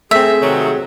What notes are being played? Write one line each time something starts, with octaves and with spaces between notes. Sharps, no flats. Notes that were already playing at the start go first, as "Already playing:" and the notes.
A3 C4 G#4 E5
C3 D#3 F#3